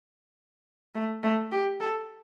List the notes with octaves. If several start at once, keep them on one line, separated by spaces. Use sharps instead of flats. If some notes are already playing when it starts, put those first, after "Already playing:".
A3
A3
G4
A4